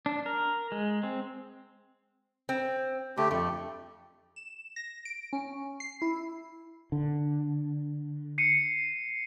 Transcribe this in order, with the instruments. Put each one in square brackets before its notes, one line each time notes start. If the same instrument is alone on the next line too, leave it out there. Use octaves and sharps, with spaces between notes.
[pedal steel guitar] D4
A#4
G#3
C4
[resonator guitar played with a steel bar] C4
[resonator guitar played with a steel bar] D3 [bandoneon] A3 G4
[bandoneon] F2 [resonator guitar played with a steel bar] A3
[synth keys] E7
A#6
D7
C#4
C7
E4
[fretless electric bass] D3
[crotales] C7 C#7 D#7